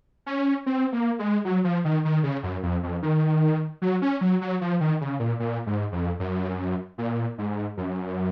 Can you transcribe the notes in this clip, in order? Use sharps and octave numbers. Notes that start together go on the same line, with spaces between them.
C#4
C4
A#3
G#3
F#3
F3
D#3
D#3
C#3
F#2
F2
F2
D#3
F#3
C#4
F#3
F#3
F3
D#3
C#3
A#2
A#2
G#2
F2
F#2
A#2
G#2
F#2